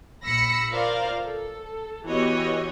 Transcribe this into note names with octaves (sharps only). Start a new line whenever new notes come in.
A#1 B5 E6 A#6 B6 C#7
F4 A#4 C5 D5 F5 A#5
A4
E3 B3 F#4 G4 C#5 D#5